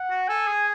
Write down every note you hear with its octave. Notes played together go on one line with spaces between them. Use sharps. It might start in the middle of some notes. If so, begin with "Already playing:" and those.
Already playing: F#5
F#4
A4 G#5
G#4